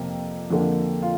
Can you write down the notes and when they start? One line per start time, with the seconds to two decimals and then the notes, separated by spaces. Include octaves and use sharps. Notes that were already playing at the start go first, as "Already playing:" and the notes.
Already playing: F2 C3 A#3
0.50 F2 D3 A#3
1.02 F4